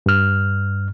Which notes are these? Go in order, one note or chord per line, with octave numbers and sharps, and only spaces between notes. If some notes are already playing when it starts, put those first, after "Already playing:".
G2 F6